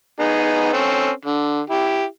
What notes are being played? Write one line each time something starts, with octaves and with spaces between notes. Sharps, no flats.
B3 D#4 G#4
C4 C#4 A4
D3
E4 G4